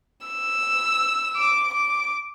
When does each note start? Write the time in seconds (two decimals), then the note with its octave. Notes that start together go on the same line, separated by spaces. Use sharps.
0.27 E6
1.36 D6
1.73 D6